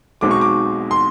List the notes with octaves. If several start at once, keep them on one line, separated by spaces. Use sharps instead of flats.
B1 B2 G#3 C4 D#4 D6
C#6
D6
C6